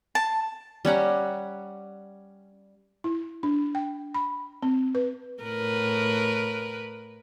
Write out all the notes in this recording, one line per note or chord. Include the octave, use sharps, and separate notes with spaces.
A5
G3 C#4 F#5 A#5
E4
D4
G5
B5
C4
B4
A2 A#4 B4